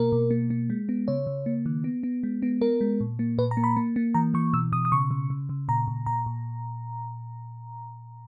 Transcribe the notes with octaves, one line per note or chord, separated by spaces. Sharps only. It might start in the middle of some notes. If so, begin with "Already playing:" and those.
Already playing: B2 A#3 A#4
B2
A#3
A#3
G#3
B3
C#3 C#5
C#3
A#3
D#3
B3
B3
G#3
B3
B3 A#4
G#3
A#2
A#3
A#2 B4
A#5
A#3
B5
A#3
A#3
E3 A#5
E3 C#6
B2 E6
B2 D#6
D#6
C#3 C#6
C#3
C#3
C#3
A#2 A#5
A#2
A#2 A#5
A#2